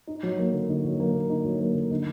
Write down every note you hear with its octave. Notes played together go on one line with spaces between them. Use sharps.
D#4
F#3
A#3
D3
D#4
F#3
A#3
D3
D#4
F#3
A#3
D3
D#4